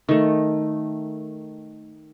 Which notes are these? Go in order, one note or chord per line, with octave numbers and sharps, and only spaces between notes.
D#3 A3